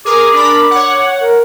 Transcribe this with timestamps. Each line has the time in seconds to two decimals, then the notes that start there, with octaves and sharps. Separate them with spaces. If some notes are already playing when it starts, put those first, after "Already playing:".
0.05 G#4 A#4 D6
0.33 D4 A#4 B5
0.71 C#5 F#5
1.21 A#4